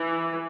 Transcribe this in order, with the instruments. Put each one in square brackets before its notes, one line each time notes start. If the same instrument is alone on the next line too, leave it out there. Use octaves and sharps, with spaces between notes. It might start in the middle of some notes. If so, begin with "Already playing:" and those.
Already playing: [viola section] E3